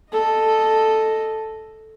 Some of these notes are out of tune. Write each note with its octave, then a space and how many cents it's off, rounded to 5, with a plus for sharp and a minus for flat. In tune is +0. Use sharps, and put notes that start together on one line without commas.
A4 +0 D#5 -10